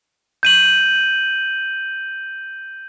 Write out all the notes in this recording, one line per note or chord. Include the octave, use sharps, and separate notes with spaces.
G6 D#7 F#7